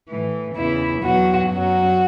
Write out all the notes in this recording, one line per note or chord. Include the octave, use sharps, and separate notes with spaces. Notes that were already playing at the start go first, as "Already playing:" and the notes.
A2 E3
E2 C#3 E3 E4
E2 B2 F#3 F#4
F#2 F#3 F#4